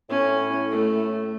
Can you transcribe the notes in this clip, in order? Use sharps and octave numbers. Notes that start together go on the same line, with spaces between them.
A2 C#4
A3